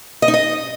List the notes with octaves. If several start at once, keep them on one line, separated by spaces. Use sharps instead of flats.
D#5
D#4
D#5